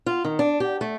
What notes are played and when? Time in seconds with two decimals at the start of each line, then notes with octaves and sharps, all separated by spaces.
0.06 F4
0.24 D#3
0.39 D4
0.60 G4
0.81 A3